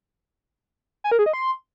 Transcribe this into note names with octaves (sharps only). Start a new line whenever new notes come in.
G#5
A#4
G#4
D#5
C6